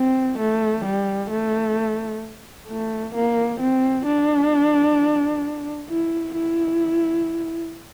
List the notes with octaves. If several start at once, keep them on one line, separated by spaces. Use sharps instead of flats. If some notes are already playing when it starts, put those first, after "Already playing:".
Already playing: C4
A3
G3
A3
A3
A#3
C4
D4
E4
E4